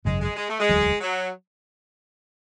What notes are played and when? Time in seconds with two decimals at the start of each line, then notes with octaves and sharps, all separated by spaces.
0.05 G#1 F#2 C#3 F#3 G#3
0.21 G#3
0.36 G#3
0.49 A3
0.60 G#3
0.69 E1 D2 D3 F#3
1.01 F#3